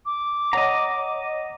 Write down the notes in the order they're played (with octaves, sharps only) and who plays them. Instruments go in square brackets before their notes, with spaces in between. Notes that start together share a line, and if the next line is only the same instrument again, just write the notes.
[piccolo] D6
[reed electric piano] C#5 F#5 [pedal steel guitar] D#5 A#5